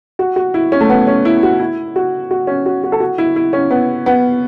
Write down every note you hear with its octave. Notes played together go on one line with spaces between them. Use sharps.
F#4
F#4
E4
C#4
A3
B3
C#4
E4
F#4
E4
F#4
F#4
C#4
F#4
F#4
A4
F#4
E4
E4
C#4
B3
B3